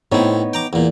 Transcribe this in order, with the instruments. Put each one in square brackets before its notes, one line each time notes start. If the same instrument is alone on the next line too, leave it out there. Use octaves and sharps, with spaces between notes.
[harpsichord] A2 C4 [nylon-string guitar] B3 D#4 C#5
[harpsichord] G5 A#5 D6
E2 A#2